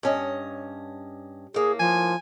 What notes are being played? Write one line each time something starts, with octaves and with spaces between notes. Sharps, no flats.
G2 C#4 D#5
A2 A#3 G#4
F3 G#5